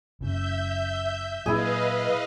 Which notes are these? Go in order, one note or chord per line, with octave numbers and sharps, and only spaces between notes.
F#1 C#3 E5 G6
A#2 F#3 E4 G#4 B4 D#5 F5